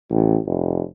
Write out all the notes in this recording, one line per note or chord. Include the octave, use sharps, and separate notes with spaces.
A1
F1